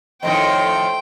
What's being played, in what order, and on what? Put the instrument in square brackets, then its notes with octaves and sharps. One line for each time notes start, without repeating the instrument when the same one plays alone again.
[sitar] F2 A2 D#3 [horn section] A3 C5 C6 [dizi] D#5 [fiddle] G5